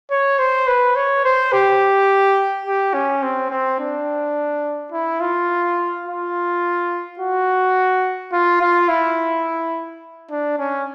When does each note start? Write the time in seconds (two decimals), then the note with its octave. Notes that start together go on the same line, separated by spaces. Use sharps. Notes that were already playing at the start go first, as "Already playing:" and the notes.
0.11 C#5
0.39 C5
0.68 B4
0.96 C#5
1.25 C5
1.53 G4
2.66 G4
2.94 C#4
3.22 C4
3.50 C4
3.80 D4
4.92 E4
5.21 F4
6.06 F4
7.19 F#4
8.33 F4
8.61 F4
8.89 E4
10.31 D4
10.59 C#4